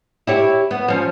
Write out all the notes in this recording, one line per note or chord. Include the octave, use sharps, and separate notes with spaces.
E4 G4 C#5
B3
F3 C#4